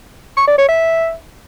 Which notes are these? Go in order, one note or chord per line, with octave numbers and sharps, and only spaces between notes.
C#6
D5
C#5
E5